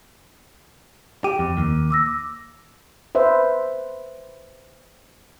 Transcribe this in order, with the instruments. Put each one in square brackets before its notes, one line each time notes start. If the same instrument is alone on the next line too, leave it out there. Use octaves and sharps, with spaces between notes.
[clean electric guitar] G4 [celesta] D6 D#7
[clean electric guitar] F2
D#2
[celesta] D6 E6 A#6
[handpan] B4 C5 E5